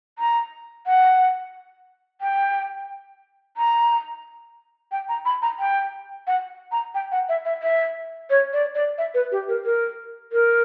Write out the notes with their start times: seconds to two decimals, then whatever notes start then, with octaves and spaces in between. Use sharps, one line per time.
0.19 A#5
0.86 F#5
2.21 G5
3.57 A#5
4.92 G5
5.09 A#5
5.25 B5
5.42 A#5
5.59 G5
6.27 F#5
6.72 A#5
6.95 G5
7.12 F#5
7.29 E5
7.45 E5
7.62 E5
8.30 C#5
8.53 D5
8.75 D5
8.98 E5
9.14 B4
9.32 G4
9.48 A#4
9.65 A#4
10.33 A#4